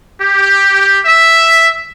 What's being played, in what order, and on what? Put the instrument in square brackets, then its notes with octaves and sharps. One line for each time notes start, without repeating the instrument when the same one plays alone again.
[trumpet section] G4
E5